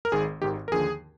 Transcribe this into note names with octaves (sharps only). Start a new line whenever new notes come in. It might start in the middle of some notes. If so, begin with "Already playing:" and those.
A#4
G#1 G#2 D#3 G#4
G#1 G#2 D#3 G4
A#4
D#2 D3 F3 G#4